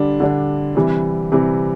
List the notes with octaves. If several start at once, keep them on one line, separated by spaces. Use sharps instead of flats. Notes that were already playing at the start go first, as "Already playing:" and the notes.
Already playing: D3 G3 D4
D3 G3 D4
C3 E3 G3
C3 E3 G3